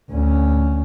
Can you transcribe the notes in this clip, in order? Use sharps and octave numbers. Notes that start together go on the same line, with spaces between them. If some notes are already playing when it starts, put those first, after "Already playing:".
D2 C#4